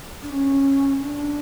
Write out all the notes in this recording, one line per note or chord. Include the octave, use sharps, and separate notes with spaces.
D4
C#4
D4